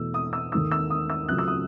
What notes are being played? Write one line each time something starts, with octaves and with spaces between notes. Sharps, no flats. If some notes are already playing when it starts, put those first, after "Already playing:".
Already playing: E2 B2 A3 E6
D#6
E6
D#2 D#3 A3 E6
E6
D#6
E6
C#2 C#3 F#3 A3 F#6
E6
D#6